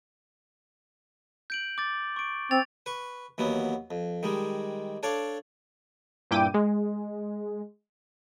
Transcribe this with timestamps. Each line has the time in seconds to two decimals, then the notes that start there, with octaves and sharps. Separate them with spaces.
1.50 G6 D7 F#7
1.78 D6 A6
2.16 C#6 D7
2.51 C4 A6 F7
2.86 B4 C#6
3.38 D#2 E3 F#3 B3
3.91 F2
4.23 D#3 G3 G#3
5.03 D4 A4 C#5 D5 F5
6.31 G2 A#2 E4 G5 D6 D#7
6.54 G#3